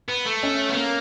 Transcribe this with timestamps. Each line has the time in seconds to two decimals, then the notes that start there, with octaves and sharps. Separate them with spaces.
0.09 B3
0.26 A3
0.43 C#4
0.69 B3
0.76 A#3